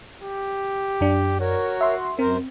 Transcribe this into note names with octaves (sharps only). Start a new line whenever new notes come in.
G4
F#2 D4
F#4 A#4 C#5
E5 C6
F#2 C4 A#4 C5